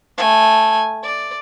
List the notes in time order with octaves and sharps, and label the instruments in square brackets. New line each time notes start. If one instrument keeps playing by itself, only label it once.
[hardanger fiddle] A3 G#5
D5